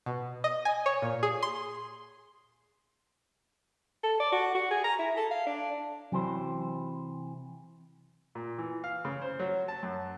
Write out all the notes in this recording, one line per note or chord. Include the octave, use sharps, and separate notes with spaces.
B2
D#5
G#5
C#5
A#2
G#4
C6
A4
D5
F#4
F#4
G#4
A#5
E4
A4
F5
D4
C3 E3 F#3 C5
A#2
E3
F5
C#3
C5
F#3
A5
F#2